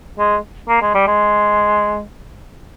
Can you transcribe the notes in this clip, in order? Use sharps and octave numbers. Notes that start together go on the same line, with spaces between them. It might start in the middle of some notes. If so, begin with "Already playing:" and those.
G#3
A#3
G#3
G3
G#3